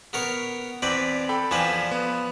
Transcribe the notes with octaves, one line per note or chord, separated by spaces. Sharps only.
B3 A#4 C#5
E2 C4 B4 D5
A4 G5 B5
E2 F3 D4 B4 G#5
B3